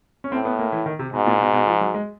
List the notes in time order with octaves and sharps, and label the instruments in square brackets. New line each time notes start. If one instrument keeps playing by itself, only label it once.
[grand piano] C#4
[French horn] A2 [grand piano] C4
[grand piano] B3
A#3
E3
D#3
C3
[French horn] G#2 [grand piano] B2
[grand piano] A#2
B2
B2
F3
F#3
G#3